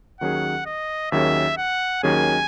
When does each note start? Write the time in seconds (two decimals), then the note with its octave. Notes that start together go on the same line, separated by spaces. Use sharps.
0.21 D#2 D#3 F#3 C#4 G#4 F#5
0.66 D#5
1.12 D#2 D#3 F#3 C#4 G#4 E5
1.58 F#5
2.03 D#2 D#3 F#3 C#4 G#4 G#5